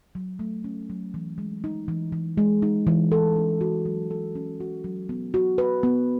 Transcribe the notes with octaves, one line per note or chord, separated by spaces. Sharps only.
F#3
A3
C#4
F#3
E3
G#3
D#4
E3
E3
G#3
D#4
E3
A4
C#4
F#4
F#3
A4
C#4
F#4
F#3
B3
F#4
B4
B3